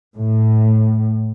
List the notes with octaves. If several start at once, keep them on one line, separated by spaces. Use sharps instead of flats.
A2